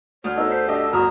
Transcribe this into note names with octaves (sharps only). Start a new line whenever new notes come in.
D2 C#5 F6
B3 D#4 A4 A#4
C5 B6 C7
D4 G4 D#5 E5
G1 E4 F#4 A#4 D#6